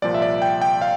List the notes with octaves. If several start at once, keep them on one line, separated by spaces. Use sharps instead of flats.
C2 A#2 F3 D5
E5
D5
G5
G5
F5